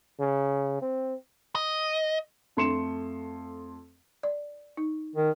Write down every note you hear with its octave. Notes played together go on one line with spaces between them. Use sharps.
C#3
C4
D#5
F2 A3 C6 C#7 E7
D5
D#4
D#3